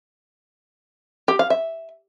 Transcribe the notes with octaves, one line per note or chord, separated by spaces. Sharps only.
G4
F5
E5